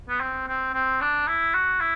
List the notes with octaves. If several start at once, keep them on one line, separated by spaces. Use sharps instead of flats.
B3
C4
C4
C4
D4
E4
F#4
E4